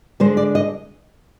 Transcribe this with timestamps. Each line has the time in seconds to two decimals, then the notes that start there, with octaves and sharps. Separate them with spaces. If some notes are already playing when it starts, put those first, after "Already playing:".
0.20 D3 G#3 D4 C5
0.37 D5
0.55 D#5